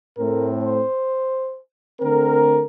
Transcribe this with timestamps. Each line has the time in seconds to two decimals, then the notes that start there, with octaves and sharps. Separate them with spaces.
0.18 A2 A3 C4 A#4
0.64 C5
1.99 D3 A3 C4 A#4